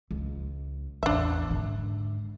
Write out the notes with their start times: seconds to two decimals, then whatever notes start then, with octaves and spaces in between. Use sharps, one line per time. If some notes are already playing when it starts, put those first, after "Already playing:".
0.11 C#2
1.03 A1 E2 D4 E5
1.50 G#2 D3